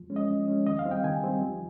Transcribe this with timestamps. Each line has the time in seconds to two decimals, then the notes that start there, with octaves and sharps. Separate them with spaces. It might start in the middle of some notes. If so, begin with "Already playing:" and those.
Already playing: F3
0.10 G#3 C#4
0.16 D#5
0.29 F3
0.48 G#3 C#4
0.67 D#3 D#5
0.79 F5
0.85 G3 C4 D#4
0.91 G5
1.04 D#3 G#5
1.23 G3 C4 D#4
1.42 F3